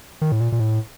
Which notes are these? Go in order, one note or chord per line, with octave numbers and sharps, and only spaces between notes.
D#3
A2
A#2
A#2
A2